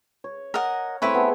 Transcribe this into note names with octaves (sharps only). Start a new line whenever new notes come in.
C#5
A#4 D#5 F#5
A3 C4 E4 B4 C#5
B3 G#4 A4